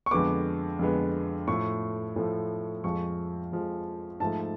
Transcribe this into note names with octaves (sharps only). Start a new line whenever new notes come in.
C#6
F2 D3 G#3 B3 D6
F2 D3 G#3 B3
A2 F3 A3 C#6
A2 F3 A3
F2 F3 G#3 C#6
F2 F3 G#3
G#2 F3 A3 A5